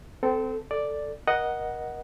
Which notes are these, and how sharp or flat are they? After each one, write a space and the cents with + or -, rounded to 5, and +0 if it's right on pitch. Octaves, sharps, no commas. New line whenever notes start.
C4 -25 A4 +0
A4 +10 D5 +0
A#4 +30 D#5 +0 F#5 +0